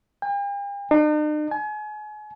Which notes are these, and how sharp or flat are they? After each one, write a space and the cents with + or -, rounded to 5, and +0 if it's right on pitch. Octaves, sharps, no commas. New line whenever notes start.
G5 +45
D#4 -45
G#5 +35